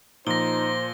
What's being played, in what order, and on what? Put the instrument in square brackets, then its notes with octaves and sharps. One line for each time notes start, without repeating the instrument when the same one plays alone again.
[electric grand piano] A#2 F3 [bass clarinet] D#4 [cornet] C5 [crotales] A#6 G7